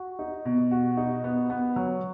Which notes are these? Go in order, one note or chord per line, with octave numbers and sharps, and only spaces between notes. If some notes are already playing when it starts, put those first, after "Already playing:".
Already playing: F#4
D#4
B2
F#4
D#4
B3
B3
F#3